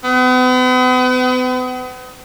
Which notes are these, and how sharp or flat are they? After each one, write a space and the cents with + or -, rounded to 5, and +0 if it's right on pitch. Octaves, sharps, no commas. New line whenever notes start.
B3 +40